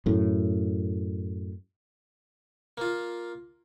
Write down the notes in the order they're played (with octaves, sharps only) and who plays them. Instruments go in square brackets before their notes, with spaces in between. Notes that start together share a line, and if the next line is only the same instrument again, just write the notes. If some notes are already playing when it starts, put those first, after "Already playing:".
[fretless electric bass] F#2 A2
[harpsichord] A#3 F4